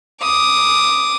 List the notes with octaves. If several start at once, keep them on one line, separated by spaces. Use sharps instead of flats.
D6 D#6